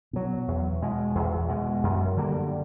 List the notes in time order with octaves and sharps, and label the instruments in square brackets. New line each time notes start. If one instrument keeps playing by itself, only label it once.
[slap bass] B2 F#3
E2
B2 G#3
E2
B2 G#3
F#2
D3 G3 A#3